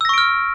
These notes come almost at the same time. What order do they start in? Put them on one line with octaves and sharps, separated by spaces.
E6 A#6 C#6 D7 F6